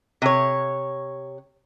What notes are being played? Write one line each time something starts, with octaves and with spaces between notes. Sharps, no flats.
C3 C#5